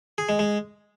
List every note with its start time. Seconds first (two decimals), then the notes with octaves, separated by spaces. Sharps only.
0.18 G#4
0.29 G#3
0.39 G#3